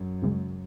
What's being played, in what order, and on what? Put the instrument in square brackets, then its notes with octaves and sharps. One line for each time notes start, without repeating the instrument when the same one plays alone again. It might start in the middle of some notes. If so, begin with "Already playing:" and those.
Already playing: [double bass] F#2
[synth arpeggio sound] C#2 C#3 G#3